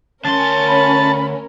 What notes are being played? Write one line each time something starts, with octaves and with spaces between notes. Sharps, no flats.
D2 C#4 A#4 A5 C6
B5